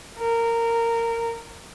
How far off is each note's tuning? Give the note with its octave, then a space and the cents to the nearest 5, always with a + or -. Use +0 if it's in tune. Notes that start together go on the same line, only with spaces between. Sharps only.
A#4 -15